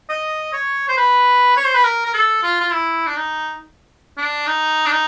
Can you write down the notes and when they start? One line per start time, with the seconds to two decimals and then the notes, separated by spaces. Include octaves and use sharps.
0.09 D#5
0.53 C#5
0.89 C5
0.97 B4
1.57 C#5
1.66 C5
1.75 B4
1.84 A#4
2.05 A#4
2.14 A4
2.43 F4
2.61 F4
2.71 E4
3.07 D4
3.16 D#4
4.17 D4
4.46 D#4
4.86 D4
4.91 D#4